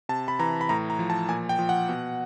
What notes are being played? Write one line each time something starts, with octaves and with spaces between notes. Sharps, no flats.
C3 A5
B5
E3 A#5
B5
A2 A#5
A#5
F3
A5
A#2 G#5
G5
F3
F#5
B2